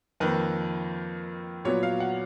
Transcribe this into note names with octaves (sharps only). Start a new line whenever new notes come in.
F2 D#3 A#3 B4
A#2 F#3 B3 C#5
F5
F#5